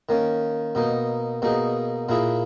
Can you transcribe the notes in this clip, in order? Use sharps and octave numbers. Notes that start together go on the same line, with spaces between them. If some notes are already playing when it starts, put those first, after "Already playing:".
D#3 A#3 C#4
B2 A#3 D#4
B2 A#3 D#4 G#4
A#2 A#3 E4 G#4